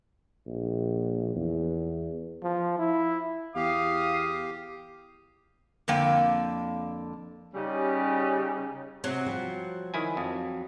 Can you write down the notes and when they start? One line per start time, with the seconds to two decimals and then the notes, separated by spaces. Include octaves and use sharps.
0.47 A#1
1.35 E2
2.43 F3
2.79 E4
3.56 E2 G4 F5 D#6
5.88 F2 D3 A#3 G5
7.54 C#3 G3 C#4 D#4 G4
9.04 C3 F#3 F#4
9.26 F3 G3
9.94 D#3 E4 G#5
10.17 F2